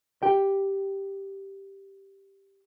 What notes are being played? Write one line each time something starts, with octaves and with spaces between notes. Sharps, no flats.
G4 G5